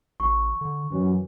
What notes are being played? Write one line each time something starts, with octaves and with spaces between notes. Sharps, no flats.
A1 C#6
D3
F#2 E3